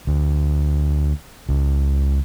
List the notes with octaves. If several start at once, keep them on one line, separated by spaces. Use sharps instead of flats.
D2
C#2